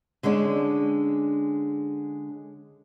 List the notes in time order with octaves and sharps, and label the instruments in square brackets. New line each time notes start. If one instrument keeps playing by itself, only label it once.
[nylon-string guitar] D3 G#3 C#4 D4